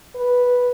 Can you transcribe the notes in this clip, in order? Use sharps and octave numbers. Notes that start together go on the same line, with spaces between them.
B4